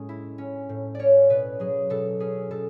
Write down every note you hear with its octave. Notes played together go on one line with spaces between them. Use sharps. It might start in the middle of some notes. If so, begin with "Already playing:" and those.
Already playing: A2 G#3 C#4
E4
C#4
A2
C#4 C#5 D5
B2 B4
F#3 G#4
B2 A4
C#4 G#4
B2 A4